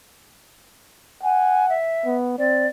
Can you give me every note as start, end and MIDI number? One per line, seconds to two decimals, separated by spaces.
1.23 1.77 78
1.23 1.68 80
1.70 2.15 76
2.05 2.37 59
2.38 2.67 60
2.38 2.67 74